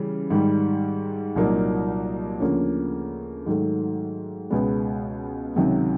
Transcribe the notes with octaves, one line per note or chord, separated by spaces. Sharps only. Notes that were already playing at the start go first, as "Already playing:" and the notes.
Already playing: C#3 E3 G3
G#2 D#3 G3
C2 A#2 F#3 A#3 D#4
D2 C#3 F3 A#3 C#4
G#2 D#3 F#3 A3
C#2 B2 G#3 B3
C#2 C3 D#3 F#3